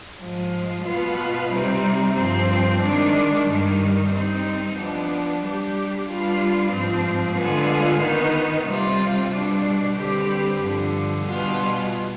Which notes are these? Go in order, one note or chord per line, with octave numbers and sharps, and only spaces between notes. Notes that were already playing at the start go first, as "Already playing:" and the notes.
G#2 F3 G#3
B2 B3 F4 B4
C3 G3 C4 D#4
G2 F3 C4
D#3 G#3 D4
G2 D#3 G3
G3 C4 D#4
F3 B3 D4
G3 D4 G4
G3 D4 F4 B4
G#2 F3 C4
D3 G#3 B3 F4 G#4
D#3 B3 D#4
C3 G3 C4 F4
B2 G3 D4
D3 G3 C4 G4 B4
G2 D3 F3
B2 G3 B3 F4 G#4